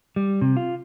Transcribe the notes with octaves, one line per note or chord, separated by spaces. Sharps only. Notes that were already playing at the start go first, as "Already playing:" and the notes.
G3
C3
F4